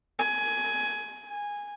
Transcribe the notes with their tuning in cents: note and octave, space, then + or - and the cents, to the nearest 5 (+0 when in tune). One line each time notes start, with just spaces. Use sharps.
G#5 +15
G#5 -15